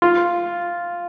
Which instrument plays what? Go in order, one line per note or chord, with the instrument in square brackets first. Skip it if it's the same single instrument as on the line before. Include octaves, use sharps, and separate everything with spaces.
[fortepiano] F4